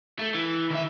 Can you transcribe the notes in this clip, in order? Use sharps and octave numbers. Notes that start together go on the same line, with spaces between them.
A3
E3
D#3 E5